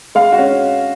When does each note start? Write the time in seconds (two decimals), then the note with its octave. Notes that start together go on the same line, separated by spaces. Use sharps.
0.15 G#3 F5
0.33 F#4
0.39 C#4